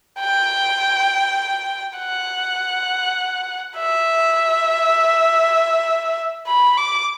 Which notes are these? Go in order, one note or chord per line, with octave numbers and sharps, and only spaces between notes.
G5
F#5
E5
B5
D6